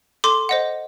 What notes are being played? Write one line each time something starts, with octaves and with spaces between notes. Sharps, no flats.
A4 C6 D6
C5 D#5 F#5